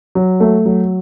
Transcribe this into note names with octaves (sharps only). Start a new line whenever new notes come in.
F#3
A3
F#3